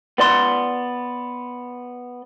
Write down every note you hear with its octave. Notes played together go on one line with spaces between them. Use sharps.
B3 D5 C6